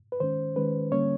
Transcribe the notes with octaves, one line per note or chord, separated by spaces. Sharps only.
B4
D#3 G#3 C#4 C5
D#3 G#3 C#4 B4
D3 G3 A#3 C#4 C#5